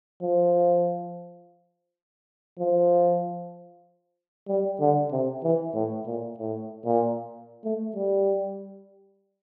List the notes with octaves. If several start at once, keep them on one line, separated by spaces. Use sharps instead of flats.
F3
F3
G3
D3
C3
E3
A2
A#2
A2
A#2
A3
G3